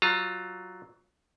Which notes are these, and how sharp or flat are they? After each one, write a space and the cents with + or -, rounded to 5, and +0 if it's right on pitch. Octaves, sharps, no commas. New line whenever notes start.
F#3 +10 F4 +15 A#5 -40